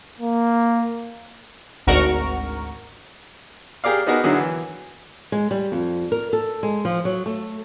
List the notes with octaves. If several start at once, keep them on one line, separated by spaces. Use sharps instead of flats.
A#3
G#1 D2 F#4 A#4 C#6
G4 G#4 A#4 D5 F5
B3 D#4 F#4 G#4 A#4
D3 D#3 F#3 E4 F#4 G#4
E3
G#3
G3
F2
A#4
A4
G#3
F3
F#3
A3